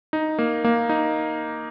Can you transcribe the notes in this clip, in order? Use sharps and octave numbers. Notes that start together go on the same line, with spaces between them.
D#4
A#3
A#3
D#4